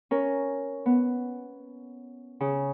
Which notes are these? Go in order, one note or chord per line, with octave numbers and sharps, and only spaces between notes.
C#4 A#4
B3
C#3